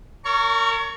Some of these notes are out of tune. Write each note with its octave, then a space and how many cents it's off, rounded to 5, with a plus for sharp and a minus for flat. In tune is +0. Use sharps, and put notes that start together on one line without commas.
A#4 -30 C#5 +30 C#6 +0